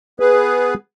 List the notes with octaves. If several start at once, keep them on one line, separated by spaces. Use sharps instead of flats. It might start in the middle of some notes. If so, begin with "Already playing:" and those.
B3 G#4 B4